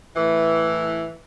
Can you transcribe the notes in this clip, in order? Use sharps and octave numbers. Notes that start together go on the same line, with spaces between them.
A2 E3